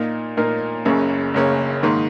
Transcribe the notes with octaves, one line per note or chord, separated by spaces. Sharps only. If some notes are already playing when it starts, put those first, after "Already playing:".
Already playing: A#2 A#3 D#4 A#4
A#2 A#3 D#4 A#4
F#1 F#2 C#3 A#3 C#4
F#1 F#2 C#3 A#3 C#4
G#2 D#3 A#3